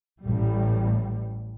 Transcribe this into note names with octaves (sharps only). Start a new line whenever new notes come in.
A1 A2 G3